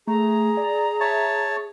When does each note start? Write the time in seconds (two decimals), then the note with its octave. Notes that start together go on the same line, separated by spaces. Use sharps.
0.07 A3 G#4 A#5
0.57 D5
1.00 C#5 E5 A5